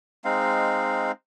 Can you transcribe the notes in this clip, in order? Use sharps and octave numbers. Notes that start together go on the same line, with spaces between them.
G#3 C4 D#4 F5